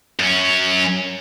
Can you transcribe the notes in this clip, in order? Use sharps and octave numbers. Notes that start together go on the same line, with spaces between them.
F#2 C#4